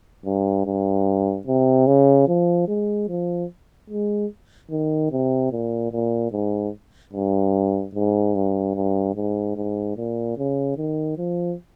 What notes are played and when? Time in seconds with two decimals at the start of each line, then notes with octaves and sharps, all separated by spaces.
0.25 G2
0.66 G2
1.47 C3
1.87 C#3
2.28 F3
2.68 G#3
3.08 F3
3.90 G#3
4.70 D#3
5.12 C3
5.52 A#2
5.92 A#2
6.32 G#2
7.14 G2
7.95 G#2
8.35 G2
8.75 G2
9.15 G#2
9.56 G#2
9.97 A#2
10.37 C#3
10.77 D#3
11.18 F3